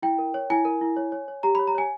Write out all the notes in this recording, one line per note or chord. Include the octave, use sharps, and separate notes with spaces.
E4 G5
A#4
C#5
E4 G#5
A#4
E4
C#5
C#5
C#5
G4 A#5
C#5 B5
A#5
C#5 G#5